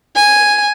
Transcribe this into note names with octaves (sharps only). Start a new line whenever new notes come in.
G#5